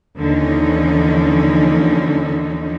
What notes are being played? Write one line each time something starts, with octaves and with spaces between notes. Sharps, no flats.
D#2 D3 E3 F3 C#4 D#4